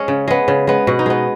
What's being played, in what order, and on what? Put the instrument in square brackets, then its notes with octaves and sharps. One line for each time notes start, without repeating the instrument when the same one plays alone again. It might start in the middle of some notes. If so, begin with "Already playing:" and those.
Already playing: [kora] G#3 C#4
C#3
G#3 B3
C#3
G#3 B3
B2 F#4
D#4
G#3 B3